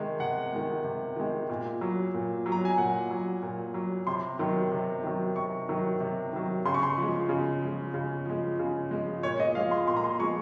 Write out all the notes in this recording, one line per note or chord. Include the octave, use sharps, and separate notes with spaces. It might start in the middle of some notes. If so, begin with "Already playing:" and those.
Already playing: C3 D#3 G#3
C3 F#5
D#3 G#3
C3
D#3 G#3
A#2
F#3
A#2
F#3
A#5
G#5
A#2 F#5
F#3
A#2
F#3
C3 C6
D#3 F#3
C3
D#3 F#3
C3 C#6
D#3 F#3
C3
D#3 F#3
C#3 C6
C#6
C6
F3
G#3
C#3
F3 G#3
C#3
F3 G#3
C#3
F3 G#3
A#2 C#5
D#5
F3 G#3 F5
C6
A#2 C6
A#5
C6
F3 G#3 C#6